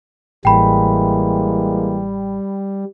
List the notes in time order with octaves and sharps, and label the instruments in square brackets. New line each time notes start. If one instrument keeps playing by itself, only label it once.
[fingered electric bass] A1 [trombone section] E3 G#3 A#3 [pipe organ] G3 [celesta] G5 B5